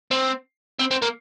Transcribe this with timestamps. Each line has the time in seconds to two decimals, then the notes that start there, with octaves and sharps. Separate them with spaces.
0.11 C4
0.79 C4
0.91 C4
1.02 A#3